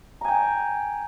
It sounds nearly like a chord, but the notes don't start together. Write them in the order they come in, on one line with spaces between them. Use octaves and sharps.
A#5 G#5 G5